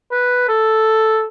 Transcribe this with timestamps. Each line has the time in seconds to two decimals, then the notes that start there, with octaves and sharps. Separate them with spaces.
0.12 B4
0.49 A4